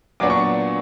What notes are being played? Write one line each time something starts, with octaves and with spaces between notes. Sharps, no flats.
A#2 F#3 B3 D4 D6
C#6